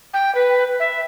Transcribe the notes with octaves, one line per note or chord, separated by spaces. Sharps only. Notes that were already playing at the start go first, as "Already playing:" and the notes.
G5
B4
E5